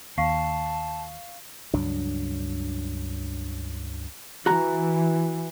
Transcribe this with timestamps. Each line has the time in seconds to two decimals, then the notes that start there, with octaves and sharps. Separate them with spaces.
0.18 D#2 F5 A5 C#6 C7
1.74 C#2 G2 F#3 D4
4.46 E3 F#4 A#5